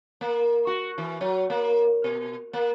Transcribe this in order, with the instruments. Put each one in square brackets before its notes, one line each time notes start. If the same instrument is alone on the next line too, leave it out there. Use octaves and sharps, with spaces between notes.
[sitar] A#3
F#4
E3
F#3
A#3
B2
A#3